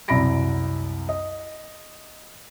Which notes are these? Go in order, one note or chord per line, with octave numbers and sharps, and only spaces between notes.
C2 F#2 D5 B5 A#6 D7
D#5